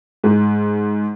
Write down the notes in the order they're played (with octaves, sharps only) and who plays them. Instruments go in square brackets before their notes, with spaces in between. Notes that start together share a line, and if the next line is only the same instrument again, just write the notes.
[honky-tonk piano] G#2